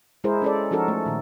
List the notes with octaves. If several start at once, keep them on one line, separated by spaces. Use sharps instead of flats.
G#3 E4 G#4 A#4 C5
C#4 A4 D5
F3 C#4 D#4 F#4 A4 A#4
A3
A#2 D#3